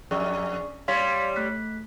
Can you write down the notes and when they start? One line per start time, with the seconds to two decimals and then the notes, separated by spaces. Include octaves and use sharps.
0.11 F2 G#4 D5 C#6
0.88 G3 C#5 D5 F5 C6 B6
1.36 A3 F#6 B6